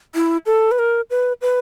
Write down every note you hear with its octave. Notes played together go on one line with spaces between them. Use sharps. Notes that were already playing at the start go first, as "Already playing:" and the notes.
E4
A4
B4
A#4
B4
B4